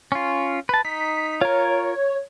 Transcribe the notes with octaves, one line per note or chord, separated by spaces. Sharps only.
C#4 F4
B4 A5
D#4 B6
F4 A#4 C#5